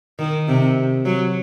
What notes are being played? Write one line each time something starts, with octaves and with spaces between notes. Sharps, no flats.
D#3
C3
F#3